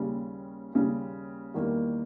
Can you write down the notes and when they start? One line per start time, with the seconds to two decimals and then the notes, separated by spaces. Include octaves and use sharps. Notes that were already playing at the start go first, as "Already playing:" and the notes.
Already playing: D#2 C#3 G3
0.74 D#2 C#3 G3
1.54 E2 D#3 G3 A#3